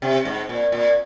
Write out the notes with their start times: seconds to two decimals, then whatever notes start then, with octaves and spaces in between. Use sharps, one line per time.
0.02 C3
0.25 G#2
0.49 A#2
0.72 A#2